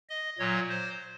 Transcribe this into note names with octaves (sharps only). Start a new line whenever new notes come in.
D#5
A#2 F#3 C#5
C5